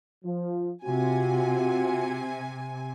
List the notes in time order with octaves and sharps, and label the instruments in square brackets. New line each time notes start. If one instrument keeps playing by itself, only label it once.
[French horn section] F3
[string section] C3 G#5 [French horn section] C4 F4 F#4